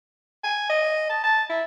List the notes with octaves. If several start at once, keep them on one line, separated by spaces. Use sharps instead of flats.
G#5
D#5
A5
A5
E4